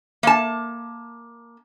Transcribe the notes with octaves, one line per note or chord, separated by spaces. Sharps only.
A#3 A5